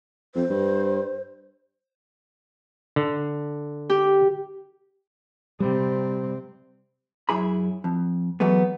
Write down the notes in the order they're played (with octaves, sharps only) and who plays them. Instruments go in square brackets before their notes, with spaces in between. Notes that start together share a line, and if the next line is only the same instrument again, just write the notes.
[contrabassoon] F2 [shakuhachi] C5
[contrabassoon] G2
[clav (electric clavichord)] D3
[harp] G4
[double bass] C3 C4 [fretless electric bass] G3
[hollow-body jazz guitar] F#2 E4 G#4 B5
F2
E3 F#3 G#3 A3 B3